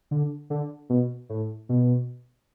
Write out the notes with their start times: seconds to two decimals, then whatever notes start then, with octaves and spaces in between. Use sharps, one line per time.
0.11 D3
0.50 D3
0.90 B2
1.29 A2
1.69 B2